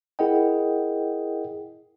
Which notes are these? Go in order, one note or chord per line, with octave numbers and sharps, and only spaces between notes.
E4 G#4 A#4 D#5 F#5 G5